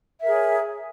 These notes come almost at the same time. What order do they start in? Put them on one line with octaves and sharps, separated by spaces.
E5 A#4 G#4 C#5